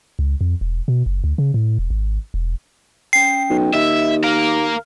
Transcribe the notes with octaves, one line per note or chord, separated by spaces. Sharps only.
C#2
F2
E1
B2
F#1
D2
C#3
A2
E1
G#1
E1
C#4 G5 C7
B1
D#2 D#5 E5
A#4 F5 F6